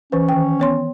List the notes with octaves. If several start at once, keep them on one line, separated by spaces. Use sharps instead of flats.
E3 C#4 B4
D#3 G5
B3 C#5 C6